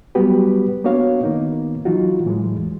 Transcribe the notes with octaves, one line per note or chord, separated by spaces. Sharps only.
F#3 G3 B3 F#4 G4 B4
A#3 B3 D4 F#4 C#5 F5
D#3 A#3 B3 D#4
E3 F#3 D#4 F4 F#4
A2 E3 F#3 G#3
E2